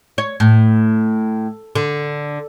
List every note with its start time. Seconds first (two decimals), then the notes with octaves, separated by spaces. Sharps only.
0.18 C#5
0.40 A2
1.75 D3